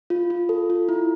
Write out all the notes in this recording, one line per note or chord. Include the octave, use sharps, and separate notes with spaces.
F4
F4
A4
F4
E4